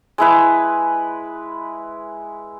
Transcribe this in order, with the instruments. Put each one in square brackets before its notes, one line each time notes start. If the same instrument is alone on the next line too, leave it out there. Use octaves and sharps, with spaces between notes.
[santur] G#3 E4 B4